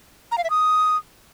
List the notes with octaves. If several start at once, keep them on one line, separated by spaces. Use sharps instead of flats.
A#5
F5
E5
D#6